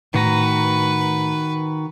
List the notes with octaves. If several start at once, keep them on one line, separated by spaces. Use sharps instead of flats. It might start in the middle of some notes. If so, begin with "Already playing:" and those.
A2 D#3 F#4 B4 A#5